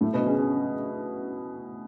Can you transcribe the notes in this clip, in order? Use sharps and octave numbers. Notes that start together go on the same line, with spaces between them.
A2 A3
B2 B3
C#3 C#4
C#3 C#4